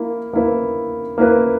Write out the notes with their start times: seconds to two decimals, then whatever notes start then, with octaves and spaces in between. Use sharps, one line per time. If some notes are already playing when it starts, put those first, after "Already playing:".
Already playing: A#3 E4
0.33 A#3 E4 B4
1.18 A#3 E4 B4